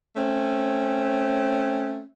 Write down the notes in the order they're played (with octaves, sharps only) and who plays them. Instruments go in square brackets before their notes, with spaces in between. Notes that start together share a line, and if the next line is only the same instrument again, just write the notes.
[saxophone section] A3 C4 C#4